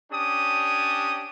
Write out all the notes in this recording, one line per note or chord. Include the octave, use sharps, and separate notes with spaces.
C#4 D4 G4 D#6